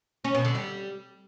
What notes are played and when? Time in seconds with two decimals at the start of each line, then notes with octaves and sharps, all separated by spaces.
0.24 C#4
0.35 B2
0.45 D3
0.55 G3